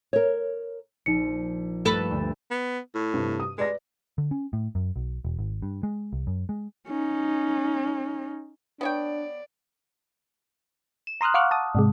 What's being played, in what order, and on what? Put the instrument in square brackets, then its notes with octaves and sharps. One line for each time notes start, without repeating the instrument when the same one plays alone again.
[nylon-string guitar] A#4 C#5
[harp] A#1 [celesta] D#4 C#7
[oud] G2 A4 B4 [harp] A3
[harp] D2
[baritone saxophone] B3
A2
[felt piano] G2 C3
D#6
[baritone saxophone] G#3 [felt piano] B4 D5 A#6
[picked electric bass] D3
C#4
A2
F#2
B1
E1
G#1
G2
G#3
C2
F#2
G#3
[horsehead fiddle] C#4 D#4
[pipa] B3 C#5 G5 [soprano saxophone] D4 [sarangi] D5
[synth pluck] E7
A#5 C6 D#6 F6 F#6
F5 F#5 C#6 D6 F6 F#6
A5 D#6
G#2 C3 G#3